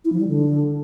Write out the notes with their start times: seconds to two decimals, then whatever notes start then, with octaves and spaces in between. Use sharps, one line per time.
0.05 E4
0.12 F3
0.20 G3
0.28 D3